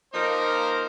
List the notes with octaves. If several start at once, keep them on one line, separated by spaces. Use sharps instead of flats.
F3 A#3 D#4 A#4 C5